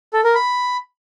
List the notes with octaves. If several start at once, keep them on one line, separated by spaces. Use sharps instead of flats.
A4
A#4
B5